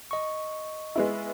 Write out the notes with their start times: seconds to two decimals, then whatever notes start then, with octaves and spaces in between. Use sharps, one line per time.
0.11 D#5 C#6
0.96 G#3 B3 E4